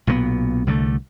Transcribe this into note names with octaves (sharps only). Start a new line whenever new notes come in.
B1 A#2 D#3 B3
C2 D3 F#3 A3